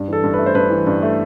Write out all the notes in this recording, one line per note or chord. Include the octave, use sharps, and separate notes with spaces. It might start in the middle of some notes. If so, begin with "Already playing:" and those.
Already playing: G2
E3 A4
G2
B4
A3
C5
G2 B4
E3
G2
A3